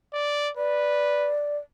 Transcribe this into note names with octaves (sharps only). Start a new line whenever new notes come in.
D5
B4 D5